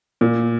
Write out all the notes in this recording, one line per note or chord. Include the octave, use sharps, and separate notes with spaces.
A#2